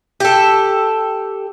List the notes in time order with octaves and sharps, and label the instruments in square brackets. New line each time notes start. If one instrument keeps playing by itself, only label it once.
[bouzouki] G4 A4